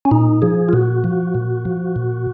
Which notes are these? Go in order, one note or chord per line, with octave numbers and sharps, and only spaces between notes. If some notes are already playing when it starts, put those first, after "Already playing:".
C#4
A#2 D#4
F3 G#4
F4
A#2 F#4
F3
A#2
F3
A#2